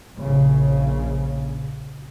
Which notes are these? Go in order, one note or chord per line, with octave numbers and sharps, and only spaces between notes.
A#1 C#3